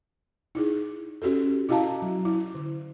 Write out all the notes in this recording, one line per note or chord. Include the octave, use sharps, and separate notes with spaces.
D#4 E4 G#4
C#4 F#4 G4 A4
E4 F#4 D#5 F5 A5 A#5
F#3
E4
D3